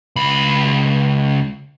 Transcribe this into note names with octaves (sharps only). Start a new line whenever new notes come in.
C#2 B5